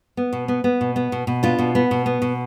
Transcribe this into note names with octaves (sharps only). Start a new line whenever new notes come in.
B3
B2
B3
B3
B2
B3
B2
B2
B3 D4 F4
B2
B3
B2
B3
B2